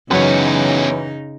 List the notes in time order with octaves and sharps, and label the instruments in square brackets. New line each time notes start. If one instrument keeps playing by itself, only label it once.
[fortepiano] F#2 C#5 [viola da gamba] C#3 D#4 [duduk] E3 [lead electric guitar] B3 C#4